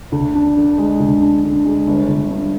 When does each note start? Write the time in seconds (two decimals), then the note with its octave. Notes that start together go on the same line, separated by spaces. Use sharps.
0.12 D2
0.35 D4
0.57 D3
0.78 G#3
1.00 D2
1.22 D4
1.44 D3
1.65 G#3
1.87 G1
2.09 G1
2.30 G2